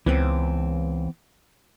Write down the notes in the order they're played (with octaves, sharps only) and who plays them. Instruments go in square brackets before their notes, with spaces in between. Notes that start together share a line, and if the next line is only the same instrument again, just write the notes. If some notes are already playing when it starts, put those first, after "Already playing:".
[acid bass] C#2 [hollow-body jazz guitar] E3 B3 C4